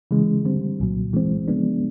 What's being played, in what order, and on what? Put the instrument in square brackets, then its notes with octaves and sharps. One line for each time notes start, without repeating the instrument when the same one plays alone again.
[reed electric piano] C#3 E3 G#3
D3 G3 C4
C2 A#2 F#3
E3 G#3 C4
C#3 F3 G#3 B3 D4